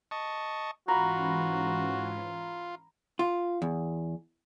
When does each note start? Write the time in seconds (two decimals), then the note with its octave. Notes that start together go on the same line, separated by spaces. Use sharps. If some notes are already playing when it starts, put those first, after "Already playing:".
0.11 D#5 A5 C#6
0.88 G#2 E3 C#4 F4 F#4 A#5 B5
3.19 F4
3.62 E2